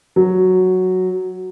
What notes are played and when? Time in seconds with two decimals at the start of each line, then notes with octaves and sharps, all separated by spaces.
0.16 F#3